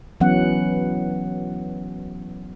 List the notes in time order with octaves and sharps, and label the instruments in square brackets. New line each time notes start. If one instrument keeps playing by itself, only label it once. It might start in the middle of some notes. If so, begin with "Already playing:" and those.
[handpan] E3 F#3 B3 C#4 F#5